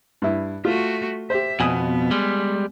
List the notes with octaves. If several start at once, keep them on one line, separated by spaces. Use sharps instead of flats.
G2 E4
A3 F4 F#4
G4 C5 E5
F2 B2 B3 G#5 D#6
G3 G#3